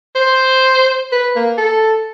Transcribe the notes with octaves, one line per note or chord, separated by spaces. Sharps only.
C5
B4
A#3
A4